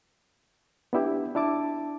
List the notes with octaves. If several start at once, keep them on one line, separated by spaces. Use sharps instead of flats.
B3 D4 E4 G4
D4 E4 A5 D6